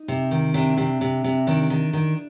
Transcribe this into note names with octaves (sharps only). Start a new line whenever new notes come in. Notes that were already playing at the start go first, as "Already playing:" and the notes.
Already playing: D#4
C3
D#3
C3 D4
C3
C3
C3
D#3 D4
D#3
D#3